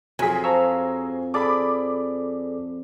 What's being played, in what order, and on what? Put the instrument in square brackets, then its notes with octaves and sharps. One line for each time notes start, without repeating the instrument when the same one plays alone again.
[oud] F2 [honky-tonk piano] F#3 G#4 [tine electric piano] G#5 B6
[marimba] C5 F5 A5 [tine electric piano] A#5 C#6 E6
[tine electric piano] G#4 A4 D5 [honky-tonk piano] B5 D6